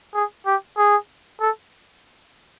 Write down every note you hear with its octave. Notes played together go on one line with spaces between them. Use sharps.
G#4
G4
G#4
A4